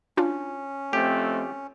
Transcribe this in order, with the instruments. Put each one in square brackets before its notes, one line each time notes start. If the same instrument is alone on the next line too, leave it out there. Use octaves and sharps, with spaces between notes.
[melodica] C#4 [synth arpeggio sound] D4 F4
[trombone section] F2 A3 C4 [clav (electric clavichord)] G4